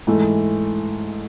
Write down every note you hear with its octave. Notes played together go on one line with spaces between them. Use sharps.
G#2 E3 A3